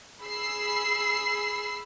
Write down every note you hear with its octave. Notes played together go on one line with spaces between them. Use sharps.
G#4 B5 E6 C7